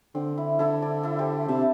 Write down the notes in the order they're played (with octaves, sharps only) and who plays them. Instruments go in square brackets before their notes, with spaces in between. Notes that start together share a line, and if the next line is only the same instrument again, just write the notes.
[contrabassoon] D3 [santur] C4
[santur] E4
[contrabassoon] D3 [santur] E4 A4
[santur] A4 D5
E4 A4
G4 C5
[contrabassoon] C3 [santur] E5 A5